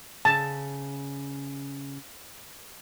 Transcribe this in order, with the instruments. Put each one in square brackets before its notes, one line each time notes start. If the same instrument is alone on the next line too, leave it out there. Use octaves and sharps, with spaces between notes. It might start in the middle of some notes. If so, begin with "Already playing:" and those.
[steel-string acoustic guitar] C#3 [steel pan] A5